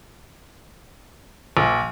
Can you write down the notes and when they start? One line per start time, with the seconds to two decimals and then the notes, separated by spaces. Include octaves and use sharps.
1.57 A#1